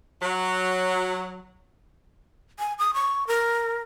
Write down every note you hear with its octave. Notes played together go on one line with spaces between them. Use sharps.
F#3
G#5
D#6
C#6
A#4